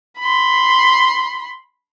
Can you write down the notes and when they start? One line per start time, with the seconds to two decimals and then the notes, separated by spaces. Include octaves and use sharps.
0.19 B5 C6